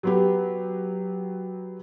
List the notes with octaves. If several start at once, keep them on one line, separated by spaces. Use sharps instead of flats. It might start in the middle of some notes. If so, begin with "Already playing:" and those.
F#3 B3 G4